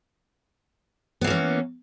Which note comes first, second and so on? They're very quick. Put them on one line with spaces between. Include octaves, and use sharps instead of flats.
B3 E3 A#3 C#4